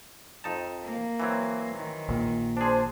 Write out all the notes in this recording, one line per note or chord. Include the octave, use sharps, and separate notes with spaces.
F2 D#4 A5
A#3
E3 F#3 C4
D#3
A#1 A#2
D4 G#4 C5 A5